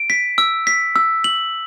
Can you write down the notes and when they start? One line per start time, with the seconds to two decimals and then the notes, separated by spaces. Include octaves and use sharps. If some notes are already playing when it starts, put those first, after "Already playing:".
Already playing: D7
0.10 B6
0.38 E6
0.67 B6
0.96 E6
1.24 F#7